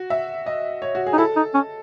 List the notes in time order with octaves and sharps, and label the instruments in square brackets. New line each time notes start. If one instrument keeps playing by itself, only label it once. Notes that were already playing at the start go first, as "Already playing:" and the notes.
Already playing: [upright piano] F#4
E5
D#5
C#5
F#4
G#4
[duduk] D#4
[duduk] E4 [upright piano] A4
[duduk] D#4
C#4